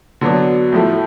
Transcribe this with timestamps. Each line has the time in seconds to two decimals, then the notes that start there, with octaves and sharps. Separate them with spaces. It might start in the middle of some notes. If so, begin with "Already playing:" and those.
0.21 D3 F#3 B3 D4
0.72 A2 F3 A3